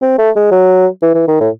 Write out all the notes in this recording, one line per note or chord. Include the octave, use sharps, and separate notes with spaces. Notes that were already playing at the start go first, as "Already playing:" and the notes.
C4
A3
G#3
F#3
E3
E3
D#3
A2